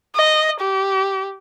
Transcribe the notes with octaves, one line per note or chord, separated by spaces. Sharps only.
D#5
G4